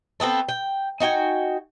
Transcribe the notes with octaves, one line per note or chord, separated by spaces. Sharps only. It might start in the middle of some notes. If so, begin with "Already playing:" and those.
A3 B3 C4 A4
G5
D#4 F#4 G5 G#5